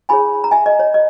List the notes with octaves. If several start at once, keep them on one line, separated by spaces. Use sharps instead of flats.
E4 G#4 C#5 G#5 B5
A#5
E5 G#5
D#5
C#5
D#5